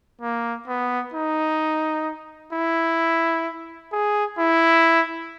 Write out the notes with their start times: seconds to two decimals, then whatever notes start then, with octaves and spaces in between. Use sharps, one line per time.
0.22 A#3
0.68 B3
1.14 D#4
2.53 E4
3.92 G#4
4.38 E4